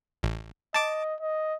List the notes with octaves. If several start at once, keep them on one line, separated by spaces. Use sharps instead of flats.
A1
D#5 A5 D6
D#5